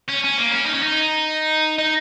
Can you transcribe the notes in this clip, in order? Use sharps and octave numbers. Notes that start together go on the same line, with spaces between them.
C#4
C#4
A#3
C#4
D#4
C#4
D#4
D#4